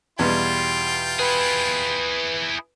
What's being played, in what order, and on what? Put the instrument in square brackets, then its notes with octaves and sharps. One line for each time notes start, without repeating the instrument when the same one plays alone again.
[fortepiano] E2 B2 G3 [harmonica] F4 G5 [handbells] C6 G#6
[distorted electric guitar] E4 G#4 [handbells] B4 B5